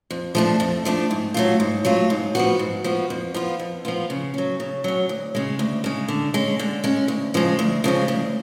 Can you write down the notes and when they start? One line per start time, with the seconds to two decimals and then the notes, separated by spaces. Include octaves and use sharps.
0.11 F2
0.35 F3 A3 D4
0.60 F2
0.85 F3 A3 D4
1.11 G#2
1.34 F#3 A3 F4
1.60 G#2
1.85 F#3 A3 F4
2.10 G#2
2.35 F3 B3 F#4
2.59 G#2
2.84 F3 B3 F#4
3.10 F2
3.34 F3 B3 F4
3.59 F2
3.85 F3 B3 F4
4.10 C#3
4.34 F#3 C#4
4.60 C#3
4.84 F#3 C#4
5.09 D2
5.35 C#3 G#3
5.59 D2
5.84 C#3 G#3
6.08 D3
6.34 G#3 C#4
6.59 D3
6.84 G#3 C#4
7.08 D2
7.34 C#3 F3 G#3
7.59 D2
7.84 C#3 F3 G#3
8.08 D2